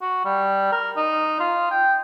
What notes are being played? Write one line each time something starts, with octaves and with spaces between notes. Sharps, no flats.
F#4
G3
A#4
D#4
F4
G5